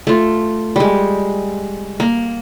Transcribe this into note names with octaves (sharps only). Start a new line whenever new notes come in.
A3 F4
G3 G#3
A#3